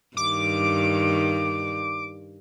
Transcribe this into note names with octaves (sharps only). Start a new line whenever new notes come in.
G2 D#3 D6